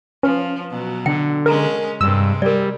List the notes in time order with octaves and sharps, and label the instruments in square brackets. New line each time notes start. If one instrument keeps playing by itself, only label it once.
[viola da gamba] F3 [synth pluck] C#4 [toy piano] B4
[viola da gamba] B2 F#3
[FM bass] D3 [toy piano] G5
[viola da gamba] G#3 C#4 [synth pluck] A#4
[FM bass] G2 [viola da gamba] C3 G#3 [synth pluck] E6
[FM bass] G3 [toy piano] A#4 D5